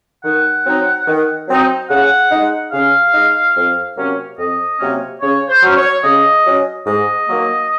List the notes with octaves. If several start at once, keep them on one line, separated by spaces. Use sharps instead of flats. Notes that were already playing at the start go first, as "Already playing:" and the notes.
D#3 F#5
F#3 C4 D#4
D#3
F#3 C4 D#4
C#3 F#5
G#3 D#4
C#3 F5
G#3 D#4
F2
C3 F#3 A#3 C#4
F2 D#5
C3 F#3 A#3 C#4
C#3 C#5
C5
F#3 C#4
C#5
C#3 D#5
F#3 C#4
G#2 D#5
D#3 F#3 A#3